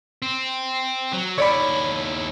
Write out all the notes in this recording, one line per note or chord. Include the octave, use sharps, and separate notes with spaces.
C4
F#3
D#2 E4 C#5 D5 B5